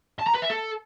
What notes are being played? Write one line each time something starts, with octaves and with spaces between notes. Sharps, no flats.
A5
A#5
B4
E5
A4